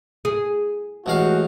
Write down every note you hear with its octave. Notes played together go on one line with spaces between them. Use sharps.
G#4
A1 G#3 F#4 F5